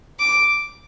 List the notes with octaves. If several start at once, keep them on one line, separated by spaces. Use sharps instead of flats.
D6